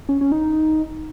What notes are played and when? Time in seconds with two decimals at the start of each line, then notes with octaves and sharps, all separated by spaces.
0.09 C#4
0.21 C#4
0.32 D#4